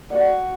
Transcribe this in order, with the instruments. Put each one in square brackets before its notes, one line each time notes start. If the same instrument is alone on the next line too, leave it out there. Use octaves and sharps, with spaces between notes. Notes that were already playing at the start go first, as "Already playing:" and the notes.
[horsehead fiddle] F#4 [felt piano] D5